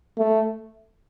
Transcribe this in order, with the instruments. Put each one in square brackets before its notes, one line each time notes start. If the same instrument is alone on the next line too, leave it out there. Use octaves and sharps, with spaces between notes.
[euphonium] A3